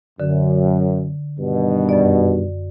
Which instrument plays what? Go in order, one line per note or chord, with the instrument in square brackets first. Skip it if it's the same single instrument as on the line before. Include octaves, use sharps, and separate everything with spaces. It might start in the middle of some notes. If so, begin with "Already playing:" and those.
[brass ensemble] F#2 [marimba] D3
[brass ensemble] G2 B2 D#3
[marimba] F#2 D5